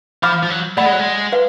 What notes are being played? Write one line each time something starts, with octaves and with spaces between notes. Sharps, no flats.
F3 F5 B5 D6 F6
F3
F#3
A3 D5 F#5 B5
G#3
F#3
G#3
B4 F5